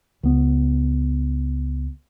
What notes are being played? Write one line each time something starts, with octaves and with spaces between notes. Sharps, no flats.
C#2 B3